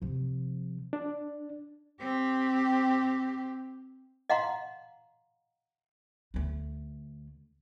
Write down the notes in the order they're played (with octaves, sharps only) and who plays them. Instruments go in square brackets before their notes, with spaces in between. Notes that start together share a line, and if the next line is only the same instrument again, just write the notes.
[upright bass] C3 F3
[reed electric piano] D4
[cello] C4 G4
[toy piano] D#5 F5 F#5 A#5 C6
[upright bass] D2 A3